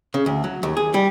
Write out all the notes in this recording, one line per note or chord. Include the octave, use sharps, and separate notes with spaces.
C#3
D2
F#3
D#2
G#4
G3